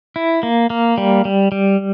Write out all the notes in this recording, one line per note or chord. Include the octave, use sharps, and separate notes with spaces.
E4
A#3
A#3
G3
G3
G3